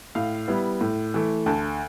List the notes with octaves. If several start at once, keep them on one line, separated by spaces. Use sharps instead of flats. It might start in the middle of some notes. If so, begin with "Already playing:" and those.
A2 F5
G3 B3 E4
A2
E3 A3
D2 A5